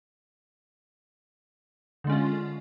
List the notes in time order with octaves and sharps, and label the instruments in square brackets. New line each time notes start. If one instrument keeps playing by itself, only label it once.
[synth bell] D3
G#3
C#4
F4